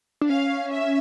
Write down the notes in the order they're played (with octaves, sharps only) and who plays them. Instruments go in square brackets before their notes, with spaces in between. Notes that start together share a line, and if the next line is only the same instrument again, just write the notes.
[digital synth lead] D4
[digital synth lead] C#4 [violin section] F5
[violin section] E5